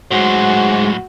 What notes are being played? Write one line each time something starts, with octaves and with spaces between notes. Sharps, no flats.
A2 F#3 G#3 F#4 C5